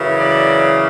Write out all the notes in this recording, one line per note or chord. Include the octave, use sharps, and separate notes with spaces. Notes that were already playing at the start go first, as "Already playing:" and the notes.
Already playing: F#2 C#3 E3
D5